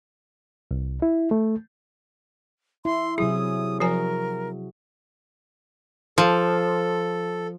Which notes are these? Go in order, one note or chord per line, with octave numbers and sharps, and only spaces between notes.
C2
E4
A3
E4 C6
C3 F#3 E4 G#4 D#6
F3 F#4 A#4 C5 G#5
F3 A4